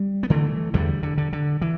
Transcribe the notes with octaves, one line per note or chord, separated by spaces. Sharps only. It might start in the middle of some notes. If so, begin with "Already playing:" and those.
Already playing: G3
B3
D3 E3 A3
E2 D3 G3
D3
D3
D3
E3